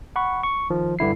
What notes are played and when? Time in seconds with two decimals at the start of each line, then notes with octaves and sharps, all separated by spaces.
0.16 F#5 B5 C#6
0.43 C#6
0.70 D#3 F3
0.99 G2 D3 E4 C7